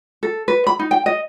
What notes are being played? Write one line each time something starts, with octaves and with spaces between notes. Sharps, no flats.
A4
B4
B5
D#4
G5
D#5